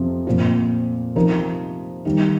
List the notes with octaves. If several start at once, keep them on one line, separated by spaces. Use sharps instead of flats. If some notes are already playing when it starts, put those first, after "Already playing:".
Already playing: F2 C3 F3
A#2 F3 C4 F4
C3 F3 D#4 A#4
D#3 G3 D#4 G4